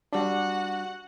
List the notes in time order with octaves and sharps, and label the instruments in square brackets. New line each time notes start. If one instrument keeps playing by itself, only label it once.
[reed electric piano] G3 D4 [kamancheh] F#4 F#5